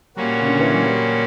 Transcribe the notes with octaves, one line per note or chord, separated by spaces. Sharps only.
A#2 G3 A#3 C#4 F#4
C#3
D3
E3
F#3
G3